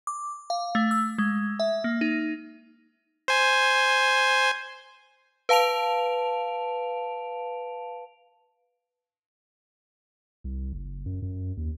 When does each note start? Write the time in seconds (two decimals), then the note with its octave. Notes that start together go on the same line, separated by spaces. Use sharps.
0.07 D6
0.50 F5
0.75 A3
0.91 E6
1.18 G#3
1.60 E5
1.84 A#3
2.01 D#4
3.28 C5 G#5
5.49 B4 F5 A5 D7 F7
10.44 C2
10.73 F#1
11.06 F#2
11.22 F#2
11.57 D#2